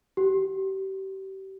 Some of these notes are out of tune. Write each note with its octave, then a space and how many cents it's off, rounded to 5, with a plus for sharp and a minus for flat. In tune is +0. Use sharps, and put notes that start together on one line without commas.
G4 -30